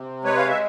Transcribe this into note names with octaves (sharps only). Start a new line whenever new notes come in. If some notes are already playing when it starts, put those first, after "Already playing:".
Already playing: C3
G#3 B4 C#5
F5
E5